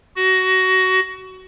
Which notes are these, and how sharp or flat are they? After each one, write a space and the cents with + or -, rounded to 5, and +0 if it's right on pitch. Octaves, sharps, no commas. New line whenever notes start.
F#4 +20